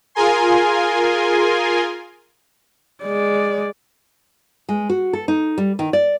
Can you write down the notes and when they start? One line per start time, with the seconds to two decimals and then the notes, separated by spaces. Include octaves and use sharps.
0.15 F4 G#4 A#4 G#5 C6
3.04 G#3 D5
4.69 G#3
4.89 F#4
5.13 A4
5.28 D#4
5.58 G3
5.79 D#3
5.93 D5